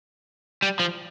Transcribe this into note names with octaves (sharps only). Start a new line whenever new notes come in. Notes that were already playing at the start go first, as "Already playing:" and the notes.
G3
F3